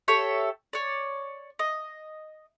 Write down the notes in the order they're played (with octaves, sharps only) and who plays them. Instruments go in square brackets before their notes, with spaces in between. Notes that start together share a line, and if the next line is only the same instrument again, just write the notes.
[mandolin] G4 A4 C#5 E5
C#5 D5
D#5